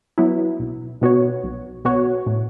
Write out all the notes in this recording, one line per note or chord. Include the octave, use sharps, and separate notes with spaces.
F#3 B3 E4
B1
B2 B3 F#4 C#5
B1
B2 B3 F#4 C#5
A2